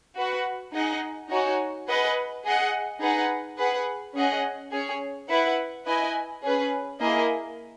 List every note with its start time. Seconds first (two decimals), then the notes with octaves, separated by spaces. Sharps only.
0.16 F#4 B4 F#5
0.73 D#4 G#4 D#5 F#5
1.30 D#4 F#4 C#5 G#5
1.87 G#4 B4 D#5 F#5
2.44 G#4 D#5 F#5
3.01 D#4 G#4 B4 F#5
3.58 G#4 B4 F#5
4.15 C#4 G#4 D#5 F#5
4.72 C#4 G#4 C#5
5.29 E4 B4 F#5
5.86 E4 B4 D#5 G#5
6.43 C#4 G#4 B4
7.00 A#3 E4 G#4 D#5